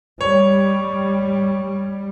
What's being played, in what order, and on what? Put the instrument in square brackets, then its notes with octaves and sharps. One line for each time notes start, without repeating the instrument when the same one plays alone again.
[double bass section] G3 [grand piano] C#5